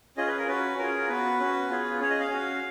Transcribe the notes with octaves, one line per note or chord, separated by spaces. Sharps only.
C#4 F4 G#4 D#5
B4
A#4
C#4 F#4 B4
C#4 F4 G#4 A#4
B3 F#4 B4
C#4 F#4
B3 F4 G#4
C#4 G#4 C#5
D#5
F5
C#4 F#4